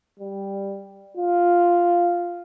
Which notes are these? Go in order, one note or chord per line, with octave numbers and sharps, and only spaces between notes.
G3
F4